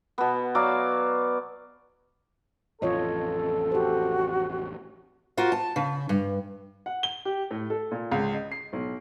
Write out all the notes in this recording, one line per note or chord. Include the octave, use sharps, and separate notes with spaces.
B2 B3
F#3 C#5 D5 F5
A1 F2 F4 A4 C#5 D#5
F#4 G4 C5
F4 F#4 A#4 C5
A5
C#3
G2
F#5
G7
G4
A2
A4
A#2
C#2
D#5
C7
B1